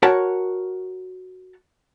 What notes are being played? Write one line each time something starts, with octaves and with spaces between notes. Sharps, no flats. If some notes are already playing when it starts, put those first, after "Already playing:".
F#4 A#4 C#5 F#5 A5